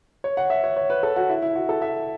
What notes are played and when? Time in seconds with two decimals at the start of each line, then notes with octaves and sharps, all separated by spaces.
0.24 C#5
0.37 F#5
0.50 E5
0.64 C#5
0.76 C#5
0.90 B4
1.03 A4
1.16 F#4
1.29 E4
1.42 E4
1.56 F#4
1.69 A4
1.82 E5